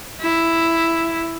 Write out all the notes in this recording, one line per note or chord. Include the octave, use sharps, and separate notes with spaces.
E4